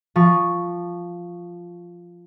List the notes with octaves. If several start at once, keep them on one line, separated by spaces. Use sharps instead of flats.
F3 C#6